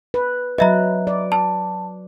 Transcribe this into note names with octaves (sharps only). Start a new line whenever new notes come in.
B4
F#3 B4 D#5 E5 A#5
D5
A5